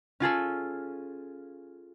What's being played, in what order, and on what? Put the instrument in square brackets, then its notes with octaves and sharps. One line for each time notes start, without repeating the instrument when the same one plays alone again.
[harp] C#4 F4 G#4 A4